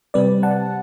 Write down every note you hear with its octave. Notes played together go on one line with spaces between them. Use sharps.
C3 G3 C4 B4 D5
F#5 A5